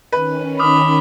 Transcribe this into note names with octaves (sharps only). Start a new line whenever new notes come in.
D#3 C#4 B4
B5 D6 D#6 F6